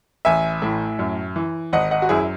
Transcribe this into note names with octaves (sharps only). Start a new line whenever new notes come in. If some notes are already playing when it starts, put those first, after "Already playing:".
A1 E5 G#5
A2
F#2
E3
G#1 D#5 F#5
D#5 F#5
F#4
F#2 E4 G#4